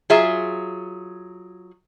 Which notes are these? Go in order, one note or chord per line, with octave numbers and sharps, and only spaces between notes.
F#3 F4 G#4 E5